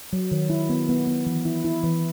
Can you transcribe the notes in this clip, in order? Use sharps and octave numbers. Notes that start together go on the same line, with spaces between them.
F#3
D#3
E4
B3
B3
B3
E3
E4
E4
E3